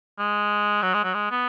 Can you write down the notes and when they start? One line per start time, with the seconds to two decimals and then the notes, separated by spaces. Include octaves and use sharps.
0.19 G#3
0.83 F#3
0.94 G#3
1.04 F#3
1.14 G#3
1.31 B3